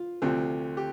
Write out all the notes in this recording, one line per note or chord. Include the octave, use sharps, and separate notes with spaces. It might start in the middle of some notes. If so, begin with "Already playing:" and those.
Already playing: F4
D2 C3 F3 A3 C4
G4